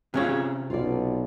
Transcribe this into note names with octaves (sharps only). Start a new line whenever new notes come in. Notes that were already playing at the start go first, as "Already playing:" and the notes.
C3 C#4 F4 G#4 C#5
B1 F4 D5